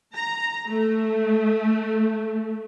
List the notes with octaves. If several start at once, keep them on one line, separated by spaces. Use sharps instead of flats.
A#5
A3